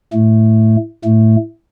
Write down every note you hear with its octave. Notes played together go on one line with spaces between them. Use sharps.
A2 A3
A2 A3